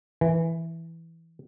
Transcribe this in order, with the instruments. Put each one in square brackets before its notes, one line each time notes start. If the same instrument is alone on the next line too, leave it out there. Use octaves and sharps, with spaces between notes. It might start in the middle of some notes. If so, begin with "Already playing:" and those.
[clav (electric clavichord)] E3